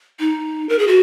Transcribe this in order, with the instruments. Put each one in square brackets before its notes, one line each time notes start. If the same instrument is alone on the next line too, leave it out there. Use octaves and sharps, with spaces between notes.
[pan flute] D#4
A#4
G#4
F#4